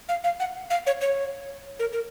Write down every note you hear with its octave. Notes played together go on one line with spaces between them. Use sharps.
F5
F5
F#5
F5
C#5
C#5
A#4
A#4